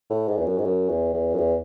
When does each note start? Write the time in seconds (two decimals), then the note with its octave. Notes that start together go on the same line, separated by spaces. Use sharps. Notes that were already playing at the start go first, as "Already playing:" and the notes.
0.10 A2
0.28 G#2
0.37 E2
0.46 F#2
0.58 G#2
0.64 F#2
0.89 E2
1.14 E2
1.34 F#2
1.38 E2